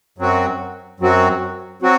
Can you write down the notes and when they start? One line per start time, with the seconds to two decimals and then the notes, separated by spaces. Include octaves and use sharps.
0.18 F#2 F#3 C4 F#4
1.00 F#2 F#3 C4 F#4
1.82 F#3 C4 F#4